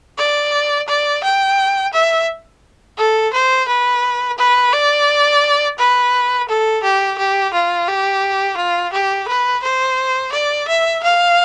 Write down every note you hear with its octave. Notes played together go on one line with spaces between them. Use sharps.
D5
D5
G5
E5
A4
C5
B4
B4
D5
B4
A4
G4
G4
F4
G4
F4
G4
B4
C5
D5
E5
F5